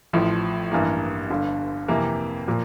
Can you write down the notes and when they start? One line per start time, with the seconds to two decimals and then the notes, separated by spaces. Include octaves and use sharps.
0.13 A1 A2 F3
0.72 A1 G2 E3 A#3
1.30 G1 G2 D3
1.88 F2 C3 E3 A#3
2.48 A#2 F3 A#3